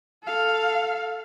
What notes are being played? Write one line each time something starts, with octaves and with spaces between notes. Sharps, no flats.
A4 F5